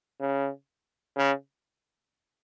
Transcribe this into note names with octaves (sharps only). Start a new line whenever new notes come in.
C#3
C#3